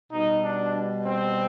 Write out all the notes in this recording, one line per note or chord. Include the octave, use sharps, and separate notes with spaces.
B2 G3 D#4
D4
C4